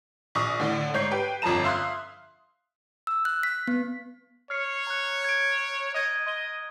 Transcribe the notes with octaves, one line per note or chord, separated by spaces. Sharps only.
A#1 C#6 D#6
A2 D3
G#2 C#5 G6 C7
G4 B4 G5
G1 F2 F3 A5 A#5 E7
E5 F5 C6 D#6 F#6
E6
F#6
B6
B3
C#5 F6 C7 C#7
A#5 F#6
G#6 D7
D#5 D#6 G#6 D#7
D#5 C6 G7